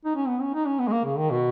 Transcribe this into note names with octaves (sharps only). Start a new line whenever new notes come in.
D#4
C#4
B3
C#4
D#4
C#4
B3
G#3
A#3
C#3
D#3
B2